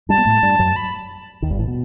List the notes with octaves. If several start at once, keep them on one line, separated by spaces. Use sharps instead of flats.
G2 G3 A5
B3
A2 A3
G2 G3
F#2 F#3
B5
D#2 D#3
G1 G2
A1 A2
B2